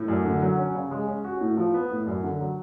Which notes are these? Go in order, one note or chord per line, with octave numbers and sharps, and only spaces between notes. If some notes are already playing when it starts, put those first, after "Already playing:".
Already playing: A2
F#2
D3
F#3
C#4
C#3
G#3
C#4
F#4
A2
F3
B3
A2
F#2
D3
F#3